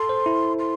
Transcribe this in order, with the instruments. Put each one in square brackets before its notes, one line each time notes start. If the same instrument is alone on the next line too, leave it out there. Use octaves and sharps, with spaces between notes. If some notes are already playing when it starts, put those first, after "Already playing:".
Already playing: [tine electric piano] A4 [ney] C6
[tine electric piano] C5
E4
[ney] C6